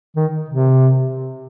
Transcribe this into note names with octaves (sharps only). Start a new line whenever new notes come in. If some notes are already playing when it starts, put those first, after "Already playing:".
D#3
C3